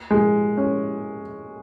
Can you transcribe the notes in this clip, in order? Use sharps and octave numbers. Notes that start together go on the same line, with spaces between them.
G#3
C#4